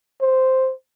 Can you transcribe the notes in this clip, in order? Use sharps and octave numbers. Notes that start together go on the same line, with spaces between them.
C5